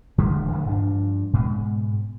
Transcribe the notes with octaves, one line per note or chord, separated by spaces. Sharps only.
D1 D3 F3 G#3
D2 D3 F#3 A3
G2 F3 D4
G#2 B2 G#3